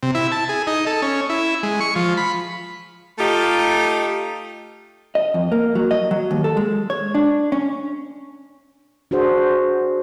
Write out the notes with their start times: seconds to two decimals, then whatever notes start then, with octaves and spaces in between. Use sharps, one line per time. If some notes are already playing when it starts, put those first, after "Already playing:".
0.03 C3
0.15 E4
0.32 A5
0.49 G#4
0.67 D#4
0.87 A4
1.02 C#4
1.30 E4
1.63 G#3
1.81 C#6
1.96 F3
2.17 B5
3.19 A3 D#4 F4 G4
5.15 D#5
5.34 F2
5.52 A#3
5.75 F#3
5.91 D#5
6.11 F#3
6.31 D#2
6.44 A4
6.57 G#3
6.90 C#5
7.15 D4
7.52 C#4
9.11 D4 F#4 G#4 C5